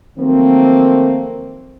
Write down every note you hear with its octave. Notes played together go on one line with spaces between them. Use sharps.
D#3 F3 F#3 A3 A#3 C4